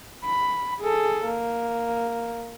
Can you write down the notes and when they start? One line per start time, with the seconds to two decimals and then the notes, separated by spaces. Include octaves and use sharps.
0.25 B5
0.81 G#4 A4
1.25 A#3